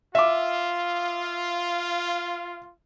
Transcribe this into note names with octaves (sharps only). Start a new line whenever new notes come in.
F4 E5 D6